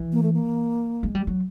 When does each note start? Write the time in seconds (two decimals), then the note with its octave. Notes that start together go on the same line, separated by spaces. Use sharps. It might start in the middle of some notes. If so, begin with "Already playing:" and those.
Already playing: E3
0.12 A#3
0.23 A3
0.33 A#3
1.03 G#3
1.15 G3
1.27 F#3